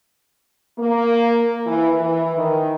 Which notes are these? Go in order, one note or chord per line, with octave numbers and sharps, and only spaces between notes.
A#3
E3
E3
D#3